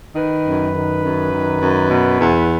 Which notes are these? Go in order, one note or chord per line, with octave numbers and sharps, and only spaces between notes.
D#3 B4
F#2
D#3
F#2
D#3
F#2
B2
E2